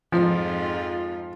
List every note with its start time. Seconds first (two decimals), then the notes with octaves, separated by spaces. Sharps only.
0.12 F2 G#2 F3 F4